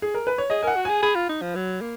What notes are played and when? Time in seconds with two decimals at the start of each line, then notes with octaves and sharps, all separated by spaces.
0.02 G#4
0.14 A#4
0.27 B4
0.38 C#5
0.50 G#4 D#5
0.63 A#4 F#5 G#5
0.76 F#4
0.85 G#4 G#5
1.02 G#4 B5
1.15 F4
1.29 D#4
1.42 F3
1.55 F#3
1.81 A#3